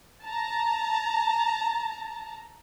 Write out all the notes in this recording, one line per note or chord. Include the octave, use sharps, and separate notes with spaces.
A5 A#5